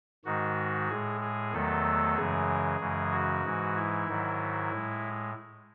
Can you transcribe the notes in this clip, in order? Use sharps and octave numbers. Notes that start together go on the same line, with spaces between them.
G#2 D#3 G#3 F#4
A2 G#3 G#4
G#4
E2 D#3 F#3 A3 A4
F#2 C#3 E3 G#3 G#4
F#2 C#3 E3 G#3
F#4
G#2 E3 G#3
E4
G#2 D#3 F#3
A2 G#3